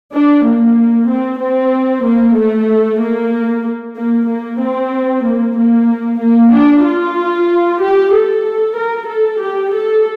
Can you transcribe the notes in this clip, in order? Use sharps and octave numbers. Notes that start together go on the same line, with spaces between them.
D4
A#3
C4
C4
A#3
A3
A#3
A#3
A#3
C4
A#3
A#3
A#3
D4
F4
G4
A4
A#4
A4
G4
A4